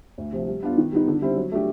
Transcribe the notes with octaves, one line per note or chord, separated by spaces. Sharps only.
D2
C3 F3
G3
B3 D4 F4
D#3
G3 B3 D#4
D3
G3 C4 E4
F#3
A3 D4 G4